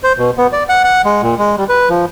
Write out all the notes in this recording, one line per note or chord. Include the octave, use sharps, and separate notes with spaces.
C5
B2
B3
D5
F#5
F#5
G#3
A#2
G#3
G3
B4
F3